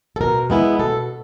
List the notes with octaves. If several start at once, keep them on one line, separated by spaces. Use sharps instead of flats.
A4
B2 A#4
G#3 B3 E4
B2 A4